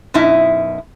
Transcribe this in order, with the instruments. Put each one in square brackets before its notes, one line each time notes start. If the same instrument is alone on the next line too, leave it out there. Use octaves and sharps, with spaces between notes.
[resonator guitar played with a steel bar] F#2 B2 D#4 E4